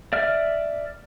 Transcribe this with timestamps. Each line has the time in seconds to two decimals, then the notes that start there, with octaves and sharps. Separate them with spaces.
0.13 D5 E5 F6